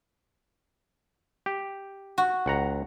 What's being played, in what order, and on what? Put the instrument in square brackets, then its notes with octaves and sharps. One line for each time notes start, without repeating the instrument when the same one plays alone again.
[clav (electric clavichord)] G4
[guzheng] F#4
[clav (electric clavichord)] C#2 F#5 A#5